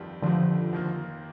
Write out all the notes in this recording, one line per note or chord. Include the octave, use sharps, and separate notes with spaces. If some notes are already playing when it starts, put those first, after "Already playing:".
Already playing: G1 F2 D#3 G3
G1 F2 D3 D#3 F3 G3
F1 D#2 D#3 A#3 F4